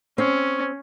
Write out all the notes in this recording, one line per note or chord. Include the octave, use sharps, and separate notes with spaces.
C4 C#4